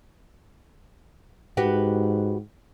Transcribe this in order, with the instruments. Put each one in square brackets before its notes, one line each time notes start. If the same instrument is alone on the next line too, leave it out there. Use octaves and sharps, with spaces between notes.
[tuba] G#2 [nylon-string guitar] F#4 G4 B4